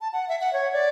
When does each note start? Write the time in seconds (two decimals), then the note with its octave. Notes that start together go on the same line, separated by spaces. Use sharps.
0.01 A5
0.13 F#5
0.29 E5
0.41 F#5
0.53 C#5
0.73 D5